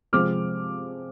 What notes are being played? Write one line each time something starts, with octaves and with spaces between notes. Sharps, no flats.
C3 F3 G#3 C4 D6 F6